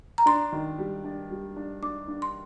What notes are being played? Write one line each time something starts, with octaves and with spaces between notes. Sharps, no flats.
A#5
D4 C6
D#3
G3
D4
G3
D4
D4 D6
D4
C6